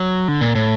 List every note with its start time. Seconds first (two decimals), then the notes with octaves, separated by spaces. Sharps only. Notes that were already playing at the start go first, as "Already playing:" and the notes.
Already playing: F#3
0.28 D3
0.41 A#2
0.55 A2